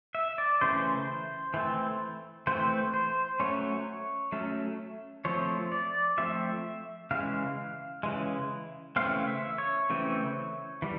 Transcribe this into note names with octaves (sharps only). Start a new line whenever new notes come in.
E5
D5
C#3 E3 A3 C5
E3 A3 C4
E3 A3 C4 C5
C5
F#3 A3 C#4 C#5
F#3 A3 C#4
F3 A3 C4 C#5
D5
F3 A3 C4 E5
C#3 E3 G#3 F5
C#3 E3 G#3
C#3 E3 A3 C4 F5
E5
C#5
C#3 E3 A3 C4
E3 G3